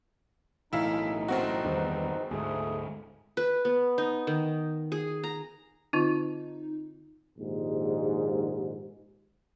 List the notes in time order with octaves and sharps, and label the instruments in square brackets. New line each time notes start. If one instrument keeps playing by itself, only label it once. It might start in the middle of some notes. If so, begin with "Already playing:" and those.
[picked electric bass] B1 A2 E3 [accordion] D#4 [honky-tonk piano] E4 F5
[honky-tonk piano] F#1 C4 F#4
[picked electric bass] E2 G2 D#3
[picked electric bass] D2 G#2 [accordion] A3 G#4
[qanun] B4
B3
D#4
D#3
G#4
A#5
[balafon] D3 C4 F4 [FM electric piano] D#4
[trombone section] A#1 D#2 G#2